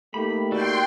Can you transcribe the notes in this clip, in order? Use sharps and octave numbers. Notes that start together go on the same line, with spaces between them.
A3 A#3 D#4 G4 B5
F#4 A4 D5 G5 C6